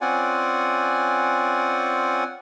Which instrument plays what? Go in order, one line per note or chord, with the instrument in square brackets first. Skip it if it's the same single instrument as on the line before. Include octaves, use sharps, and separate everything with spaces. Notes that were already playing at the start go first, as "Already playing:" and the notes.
[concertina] C4 C#4 F4 D5 F#5 G#5